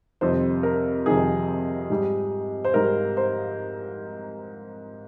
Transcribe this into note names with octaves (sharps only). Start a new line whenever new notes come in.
F2 C3 D#3 G3 C5
A#4
F2 C3 D#3 G3 G#4
G#2 G3
C5
G#2 G3 A#4
C5